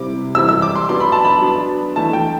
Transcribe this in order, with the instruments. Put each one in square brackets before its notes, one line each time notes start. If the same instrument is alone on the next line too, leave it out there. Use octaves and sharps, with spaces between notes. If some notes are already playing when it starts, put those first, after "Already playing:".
Already playing: [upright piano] C3 G3 C4 E4 D6
E3 G3 C4 E4 E6
E6
D6
C6
F#3 B3 D4 C6
B5
A5
B5
F#3 B3 D4
E3 A3 E4 A5
G5